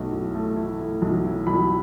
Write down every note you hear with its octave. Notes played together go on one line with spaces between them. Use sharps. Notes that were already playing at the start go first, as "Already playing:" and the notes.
Already playing: B1 A3
E4
A3
E4
A3
B1
E4
B1 B5